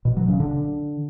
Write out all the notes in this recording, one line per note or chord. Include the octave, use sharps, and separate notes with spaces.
B2
F#3
C#3
D3